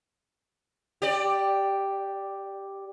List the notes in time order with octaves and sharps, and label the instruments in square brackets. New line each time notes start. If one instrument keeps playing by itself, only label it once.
[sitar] G4 D5